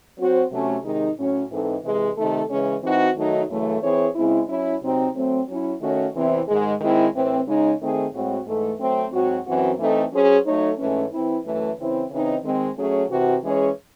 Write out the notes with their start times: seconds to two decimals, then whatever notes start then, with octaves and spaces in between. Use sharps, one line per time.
0.17 F#3 C4 F#4 C5
0.51 C3 F#3 A3 C#4
0.84 C3 D#3 G#3 D#4
1.17 A2 F#3 C#4
1.50 G#2 E3 C4 D#4 A4
1.83 C3 E3 G#3
2.16 C3 D#3 A3 D#4 A4
2.49 C#3 E3 G#3 C#4
2.83 E3 C4 D#4 F#4
3.15 D#3 F#3 A3 D#4
3.49 F#2 C#3 E3 A3
3.82 E3 C4 E4 G#4 C#5
4.15 C#3 G#3 C4 E4
4.48 F#3 C#4 E4
4.81 C3 F#3 C4 D#4
5.15 F#3 A3 C4
5.48 F#3 C#4 E4
5.81 D#3 A3 C#4 F#4 C#5
6.14 E2 C3 E3 C4 E4
6.47 G#2 D#3 G#3
6.80 D#3 G#3 C4 E4
7.13 A2 E3 C4
7.46 C#3 G#3 D#4
7.80 D#3 A3 C4 D#4 G#4
8.13 A2 G#3 C4 F#4
8.46 G#2 E3 A3
8.79 F#3 A3 C4
9.12 G#2 F#3 C4 F#4
9.46 F#2 E3 C4 F#4
9.79 E3 A3 C4 D#4 A4
10.12 F#3 C#4 G#4 C5
10.45 F#3 A3 D#4 A4 C#5
10.78 G#2 E3 A3 C#4
11.11 E3 C4 E4
11.44 F#2 E3 A3
11.77 C#3 E3 C4 E4
12.11 C#3 E3 C4 D#4
12.44 D#3 G#3 C4
12.77 F#3 A3 C#4 G#4 C#5
13.10 C3 E3 C4 F#4
13.43 E3 G#3 C#4 G#4 C#5